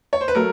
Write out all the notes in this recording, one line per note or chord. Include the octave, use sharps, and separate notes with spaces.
C#5
C5
B4
F#3 A3 A#4